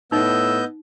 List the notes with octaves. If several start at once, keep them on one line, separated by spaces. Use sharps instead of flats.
A2 B3 D#4 D#5 E6 G6